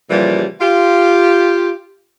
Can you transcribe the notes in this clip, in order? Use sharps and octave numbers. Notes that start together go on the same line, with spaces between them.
A#2 C#3 E3 F3 G3
F4 G4